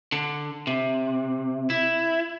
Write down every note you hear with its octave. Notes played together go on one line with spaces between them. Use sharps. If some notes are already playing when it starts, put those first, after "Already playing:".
D3
C3
E4